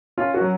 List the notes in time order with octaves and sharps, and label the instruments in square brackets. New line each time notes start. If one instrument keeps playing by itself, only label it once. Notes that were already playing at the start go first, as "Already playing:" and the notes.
[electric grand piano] C#4 [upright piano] F4
[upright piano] F#4
[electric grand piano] F#3